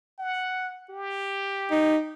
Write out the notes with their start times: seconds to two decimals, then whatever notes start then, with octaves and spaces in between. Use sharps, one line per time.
0.19 F#5
0.90 G4
1.71 D#4